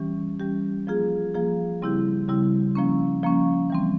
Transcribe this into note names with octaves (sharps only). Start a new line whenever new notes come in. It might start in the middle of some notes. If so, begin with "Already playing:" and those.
Already playing: E3 G3 C#4 G4
E3 G3 C#4 G4
F3 A#3 F4 G#4
F3 A#3 F4 G#4
C#3 G3 C4 E4 G4
C#3 G3 C4 E4 G4
F3 A#3 C#4
F3 A#3 C#4
E3 G3 C4